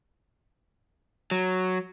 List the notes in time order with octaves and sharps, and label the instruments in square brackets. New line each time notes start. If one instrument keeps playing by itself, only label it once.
[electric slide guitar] F#3